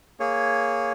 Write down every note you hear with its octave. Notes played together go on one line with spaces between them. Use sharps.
A#3 G#4 C#5